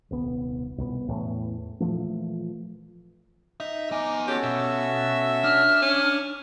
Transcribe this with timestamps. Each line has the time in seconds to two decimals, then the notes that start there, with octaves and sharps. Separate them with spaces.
0.10 D#1 C2 B3
0.78 C2 B2 B3
1.08 E2 A2 B3 C#4
1.80 A#2 E3 F3 A3
3.60 D#4 E5
3.91 B3 G#5 A#5 D6
4.27 C#4 F#4 G4 A4
4.43 B2 E5
5.44 D4 F6
5.82 C#4